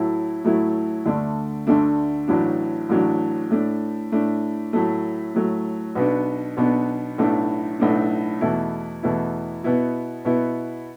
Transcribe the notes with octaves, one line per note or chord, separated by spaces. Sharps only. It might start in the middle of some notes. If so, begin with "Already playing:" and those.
Already playing: A2 F#3 A3 E4
A2 F#3 A3 E4
D2 D3 A3 D4
D2 D3 A3 D4
A1 A2 F#3 D4
A1 A2 F#3 D4
A2 A3 D4
A2 A3 D4
A2 F#3 A3
A2 F#3 A3
B1 B2 B3 D4
B1 B2 B3 D4
B1 A2 A3 D4
B1 A2 A3 D4
E2 B2 A3 E4
E2 B2 A3 E4
B2 B3 E4
B2 B3 E4